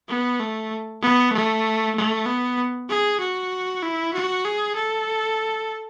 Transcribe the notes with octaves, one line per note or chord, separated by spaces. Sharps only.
B3
A3
B3
A3
A3
B3
G#4
F#4
E4
F#4
G#4
A4